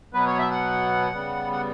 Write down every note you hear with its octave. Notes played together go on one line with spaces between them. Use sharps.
B2 F#3 B3 B4
C#5
E5
F#5
C#3 G3 B3
F#5